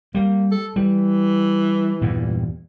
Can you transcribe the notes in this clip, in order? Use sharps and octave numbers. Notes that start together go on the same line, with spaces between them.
G3 A#3
A4
E3 G3
E2 G2 A#2